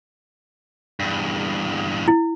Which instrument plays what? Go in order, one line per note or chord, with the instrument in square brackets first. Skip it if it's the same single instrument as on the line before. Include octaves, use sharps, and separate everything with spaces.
[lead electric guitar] E2 G2
[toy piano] E4